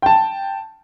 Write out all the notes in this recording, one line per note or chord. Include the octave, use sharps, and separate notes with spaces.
G5 A5